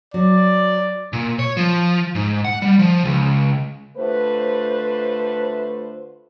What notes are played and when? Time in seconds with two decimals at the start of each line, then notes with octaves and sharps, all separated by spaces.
0.14 F#3 D5
1.13 A#2
1.39 C#5
1.57 F3
2.15 G#2
2.45 F#5
2.62 G3
2.79 F3
3.05 C#2
3.97 D3 A3 F4 B4 C5